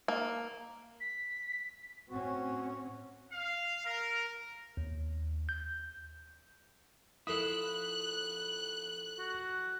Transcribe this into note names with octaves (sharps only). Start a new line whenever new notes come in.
A#3
B6
A2 C4 C#4 F#4
F5
A#4
D#2
G6
F3 E4 A4 A#4 D#6 F#6
F#4